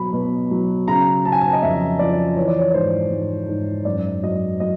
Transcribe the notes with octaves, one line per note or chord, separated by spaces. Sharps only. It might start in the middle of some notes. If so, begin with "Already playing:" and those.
Already playing: B2 F#3 B5
B2
F#3
C#3 A#5
C#3 A5
G#5
A5
D#5
F2 E5
F3 D5
E3 C#5
D5
C#5
G#2 C5
G#2
G#2
F#2 D5
F#3 D#5
F#3 D#5